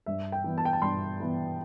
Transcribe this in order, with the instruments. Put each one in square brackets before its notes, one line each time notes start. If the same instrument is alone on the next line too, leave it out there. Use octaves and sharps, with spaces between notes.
[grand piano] G2 E5
G5
E3 B3
A5
G5
A5
G2 C6
E3 B3